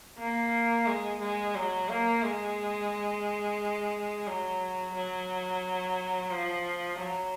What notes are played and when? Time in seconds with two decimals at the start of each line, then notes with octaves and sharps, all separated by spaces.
0.18 A#3
0.87 G#3
1.20 G#3
1.55 F#3
1.89 A#3
2.23 G#3
4.27 F#3
4.95 F#3
6.32 F3
6.99 F#3